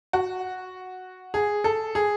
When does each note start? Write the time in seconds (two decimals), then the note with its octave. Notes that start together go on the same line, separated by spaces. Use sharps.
0.13 F#4
1.34 G#4
1.64 A4
1.95 G#4